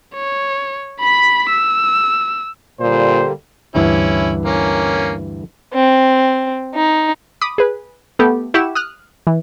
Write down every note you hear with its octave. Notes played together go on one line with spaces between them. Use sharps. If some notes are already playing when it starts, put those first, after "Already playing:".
C#5
B5 B6
E6
A#2 D3 G3 A#3 C5
D2 G2 E3 C#4 E4
A#3 C#4
C4
D#4
B5 D6 D#6 B6
G#4 B4
A3 B3 G4 A4
E4 G4 F#5 C#6 E7
D#6 F6 F#6
E3